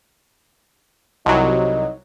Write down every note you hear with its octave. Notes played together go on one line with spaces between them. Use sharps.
C2 F#3 D#4